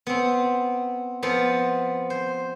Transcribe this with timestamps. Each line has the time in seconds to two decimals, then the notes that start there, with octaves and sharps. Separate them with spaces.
0.07 B3 C4
1.23 F3 B3 C4
2.10 C5